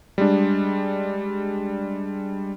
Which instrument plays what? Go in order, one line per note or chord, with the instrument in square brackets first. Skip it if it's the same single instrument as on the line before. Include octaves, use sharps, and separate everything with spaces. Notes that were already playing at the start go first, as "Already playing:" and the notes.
[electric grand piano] G3 G#3 D4